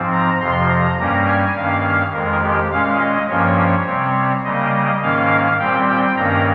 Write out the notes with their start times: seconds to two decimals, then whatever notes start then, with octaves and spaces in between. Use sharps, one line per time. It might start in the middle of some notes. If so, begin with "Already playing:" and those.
Already playing: G#2 F3 C4
0.12 A#5
0.40 F2 C3 F3 C6
0.69 A#5
0.98 G2 G3 A#3 C#4 A#5
1.27 G#5
1.56 G2 D#3 A#3 C#4 F5
2.13 F2 D#3 G#3 A#4
2.42 G4
2.71 A#2 G#3 C#4 F5
3.00 D#5
3.28 G2 F3 A#3 C#4 C#5
3.86 C3 G3 C4
4.44 C#3 G3 A#3 D#5
5.01 G#2 D#3 A#3 C#4 F5
5.59 A#2 G3 C4 G5
5.89 G5
6.16 G2 D#3 A#3 C#4 A#5